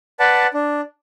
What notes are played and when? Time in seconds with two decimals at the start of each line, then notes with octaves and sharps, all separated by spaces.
0.19 B4 D5 F#5 A5
0.54 D4